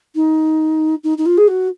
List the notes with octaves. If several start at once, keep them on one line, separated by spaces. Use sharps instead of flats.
D#4
D#4
D#4
F4
G#4
F#4